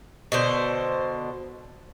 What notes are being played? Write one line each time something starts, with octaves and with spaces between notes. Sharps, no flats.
B2 D3 C5